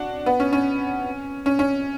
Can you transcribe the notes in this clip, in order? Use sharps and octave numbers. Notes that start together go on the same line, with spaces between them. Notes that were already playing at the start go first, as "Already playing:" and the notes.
Already playing: D4 F#4
B3
C#4
C#4
C#4
C#4